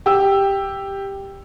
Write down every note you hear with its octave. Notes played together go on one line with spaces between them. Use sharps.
G4 E6